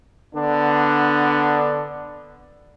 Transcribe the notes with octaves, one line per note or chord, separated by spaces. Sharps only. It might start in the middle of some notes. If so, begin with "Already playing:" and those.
D3 B3 D4